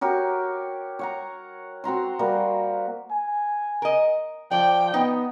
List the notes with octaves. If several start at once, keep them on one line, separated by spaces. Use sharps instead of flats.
F#4 G4 A#4 C#5
C#5 F#5 A#5
C4 F#4 A#5 C6
G3 A#3 F#4
G#5
A#4 D#5
F3 D5 G5
B3 D#4